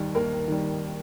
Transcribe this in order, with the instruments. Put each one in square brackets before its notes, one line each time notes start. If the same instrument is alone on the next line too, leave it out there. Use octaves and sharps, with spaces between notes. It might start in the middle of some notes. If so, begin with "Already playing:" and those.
Already playing: [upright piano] D#2 D#3 G3
D#2 A#3 A#4
D#3 G3